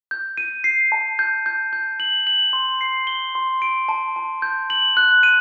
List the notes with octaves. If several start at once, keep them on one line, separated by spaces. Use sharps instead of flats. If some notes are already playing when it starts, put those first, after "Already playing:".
G6
D#7
C7
A5
G6
G6
G6
F#7
F#7
C6
C7
G7
C6
D7
A5
A5
G6
F#7
F#6
D#7